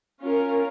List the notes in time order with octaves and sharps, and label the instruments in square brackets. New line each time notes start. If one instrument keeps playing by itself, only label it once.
[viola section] C#4 F4 A#4